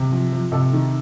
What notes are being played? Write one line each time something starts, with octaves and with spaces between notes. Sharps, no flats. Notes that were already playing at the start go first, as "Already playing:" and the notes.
Already playing: C3
F3
F3
C3 A4
D#3